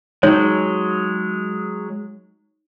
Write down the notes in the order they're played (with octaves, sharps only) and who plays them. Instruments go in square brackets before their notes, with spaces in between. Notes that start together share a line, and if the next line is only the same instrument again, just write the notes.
[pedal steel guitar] F#3 G#3 [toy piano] D#4 C#5